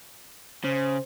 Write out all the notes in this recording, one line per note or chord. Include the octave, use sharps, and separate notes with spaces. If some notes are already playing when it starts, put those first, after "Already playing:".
C#3 C5